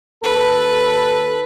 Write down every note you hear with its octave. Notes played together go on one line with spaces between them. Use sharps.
D#2 A4 B4